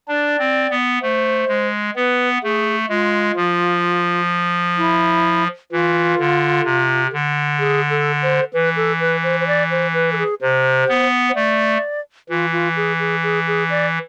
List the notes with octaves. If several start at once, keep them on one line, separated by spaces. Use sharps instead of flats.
D4 D5
C4
B3
A3 C5
G#3
B3 B4
A3 G#4
G#3 F4
F3
E4
E3 F4
D3
C3
D3
G#4
A4
C5
E3 B4
A4
B4
C5
C5
D5
C5
B4
A4
G#4
C3 C5
B3
C5
A3 D5
E3 F4
F4
G#4
G#4
G#4
G#4
D5